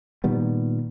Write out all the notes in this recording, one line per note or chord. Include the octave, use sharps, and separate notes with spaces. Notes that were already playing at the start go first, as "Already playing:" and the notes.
A#2 D#3 G3 B3